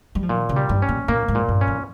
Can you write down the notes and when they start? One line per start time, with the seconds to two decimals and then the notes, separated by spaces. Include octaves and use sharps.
0.15 G3
0.23 F3
0.29 A#2 D#3
0.49 C#3
0.56 G3
0.69 G2
0.82 C#4
0.89 A#2
1.08 A#2 A#3
1.28 G#2
1.35 A#2
1.48 G2
1.61 C#4
1.67 F2